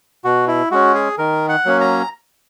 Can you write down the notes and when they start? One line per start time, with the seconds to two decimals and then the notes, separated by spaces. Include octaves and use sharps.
0.24 B2 F#4
0.48 E4
0.71 G#3 C#4 F#4
0.94 G#4
1.18 D#3 A#4
1.49 F#5
1.65 F#3 A#3 C#4
1.81 A#5